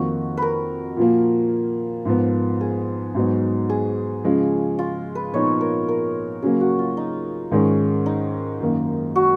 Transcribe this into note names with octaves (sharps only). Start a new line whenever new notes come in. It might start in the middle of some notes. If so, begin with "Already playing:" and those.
Already playing: F2 D#3 A#3 D#4 F#4
A#4 B4
A#2 F3 A#3
G#2 F3 B3
G#4
G#2 F#3 B3 D#4
G#4
C#3 F3 G#3
F4
B4
A#2 F3 B3 D#4 C#5
A#4
A#4
C#3 F#3 A#3 G#4
F#4
F4
D#4
G#2 D#3 G#3 C#4
D#4
F#2 D#3 A#3
F#4